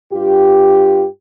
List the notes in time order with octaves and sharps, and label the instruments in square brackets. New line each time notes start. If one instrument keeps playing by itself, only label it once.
[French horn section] G2 F4 G4